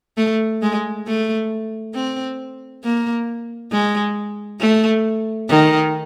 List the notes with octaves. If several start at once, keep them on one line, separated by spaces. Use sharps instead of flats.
A3
G#3
A3
C4
A#3
G#3
A3
D#3